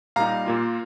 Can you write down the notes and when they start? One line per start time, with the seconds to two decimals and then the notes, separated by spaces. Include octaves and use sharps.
0.16 A#2 G3 A#3 D#4 F5 A#5
0.46 A#2 A#3 F4